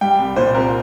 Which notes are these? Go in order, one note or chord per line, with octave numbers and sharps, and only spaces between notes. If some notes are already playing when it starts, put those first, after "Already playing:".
G3 G5
C2
A#2 C5
C2 A#4